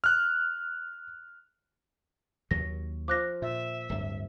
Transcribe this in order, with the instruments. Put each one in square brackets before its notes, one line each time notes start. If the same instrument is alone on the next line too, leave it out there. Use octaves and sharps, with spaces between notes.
[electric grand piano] F6 F#6
[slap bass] D#2 F#3 [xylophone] A#6
[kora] F3 F4 [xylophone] D6 F#6 A#6
[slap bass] A#2 [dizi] E5
[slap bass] D1 G2